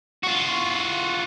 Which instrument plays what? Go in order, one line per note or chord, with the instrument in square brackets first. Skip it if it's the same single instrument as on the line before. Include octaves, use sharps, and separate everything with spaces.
[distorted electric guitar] F4 F#4